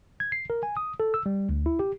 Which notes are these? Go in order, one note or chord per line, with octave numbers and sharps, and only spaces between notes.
G#6
C7
A#4
G#5
D#6
A4
E6
G3
D2
E4
G4